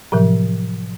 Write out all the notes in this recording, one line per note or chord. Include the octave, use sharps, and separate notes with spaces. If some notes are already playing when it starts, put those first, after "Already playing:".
A2 C3 F3 F#3